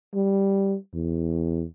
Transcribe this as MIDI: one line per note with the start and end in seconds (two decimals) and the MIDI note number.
0.15 0.76 55
0.94 1.64 40